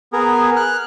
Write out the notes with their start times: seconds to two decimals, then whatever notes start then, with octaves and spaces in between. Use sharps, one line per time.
0.13 B3 G#4 A#4
0.56 F6 F#6